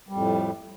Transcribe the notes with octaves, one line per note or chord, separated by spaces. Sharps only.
F2 A2 G3